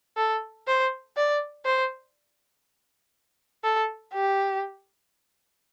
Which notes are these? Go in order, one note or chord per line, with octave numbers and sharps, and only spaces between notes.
A4
C5
D5
C5
A4
G4